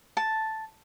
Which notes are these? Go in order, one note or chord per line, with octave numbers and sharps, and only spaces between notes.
A5